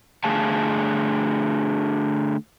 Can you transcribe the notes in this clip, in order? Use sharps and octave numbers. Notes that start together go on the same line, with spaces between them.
D3 A3 G#4 F5 A5